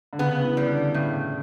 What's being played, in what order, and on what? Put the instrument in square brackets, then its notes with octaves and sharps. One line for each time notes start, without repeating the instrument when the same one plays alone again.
[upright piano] D3
[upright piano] C#3 [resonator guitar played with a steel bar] B3
[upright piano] E3
[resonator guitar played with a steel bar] G3
[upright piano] D3
[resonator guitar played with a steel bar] A2 [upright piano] C#3